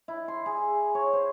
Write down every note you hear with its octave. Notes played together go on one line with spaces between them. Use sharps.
E4
C6
G#4
C#5
C5